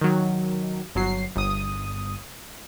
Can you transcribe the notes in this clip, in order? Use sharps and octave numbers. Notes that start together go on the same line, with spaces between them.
D#3 F#3
G1 F#3 C7
G1 D#6